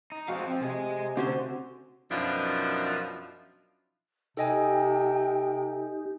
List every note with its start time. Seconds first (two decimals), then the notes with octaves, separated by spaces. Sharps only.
0.12 D#4
0.28 F3 G#3 C4 F#4 F5
0.47 F3 C4
0.62 C3 G#4 D#5
1.17 D3 C4 C#4 F#4 C5
2.10 F#2 B2 F3 D4 D#4 E5
4.37 C3 D#4 G4 A4 D#5 G5 G#5